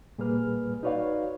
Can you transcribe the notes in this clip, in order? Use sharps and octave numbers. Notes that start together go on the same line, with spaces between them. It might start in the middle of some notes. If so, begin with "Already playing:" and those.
A#2 G3 A#3 G#4 B4 F6
D#4 F#4 B4 C#5 D5 F5